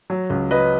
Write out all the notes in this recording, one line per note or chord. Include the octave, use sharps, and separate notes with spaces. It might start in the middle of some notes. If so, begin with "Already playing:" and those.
F#3
C#2
F#3 B4 D#5